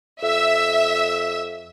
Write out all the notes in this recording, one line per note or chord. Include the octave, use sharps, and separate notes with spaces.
F2 E5